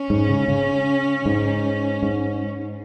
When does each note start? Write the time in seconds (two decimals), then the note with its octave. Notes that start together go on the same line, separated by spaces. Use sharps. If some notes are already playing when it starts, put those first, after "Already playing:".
Already playing: C#4
0.10 G#2
0.29 C#3
0.48 C#3
1.26 G#2
2.03 G#2